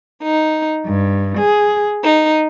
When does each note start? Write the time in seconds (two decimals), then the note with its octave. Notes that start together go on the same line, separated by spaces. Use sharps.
0.23 D#4
0.87 G2
1.39 G#4
2.04 D#4